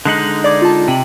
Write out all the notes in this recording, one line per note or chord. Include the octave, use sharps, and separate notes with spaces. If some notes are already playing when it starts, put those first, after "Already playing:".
D3 G#3 D#4 F#6 F#7
D5 D6 G#6
F4 A5
C3 G5 F#7